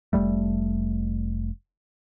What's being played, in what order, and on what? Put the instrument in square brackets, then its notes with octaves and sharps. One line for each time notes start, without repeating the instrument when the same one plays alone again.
[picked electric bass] F1 G2 G3 A3